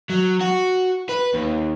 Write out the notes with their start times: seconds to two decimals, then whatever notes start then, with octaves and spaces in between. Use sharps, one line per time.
0.10 F#3
0.40 F#4
1.09 B4
1.34 D#2